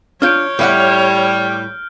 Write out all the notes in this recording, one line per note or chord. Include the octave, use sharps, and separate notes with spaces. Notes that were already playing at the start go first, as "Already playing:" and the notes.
D4 F4 C#5 F6 G6 D7
A2 G3 E5 F#5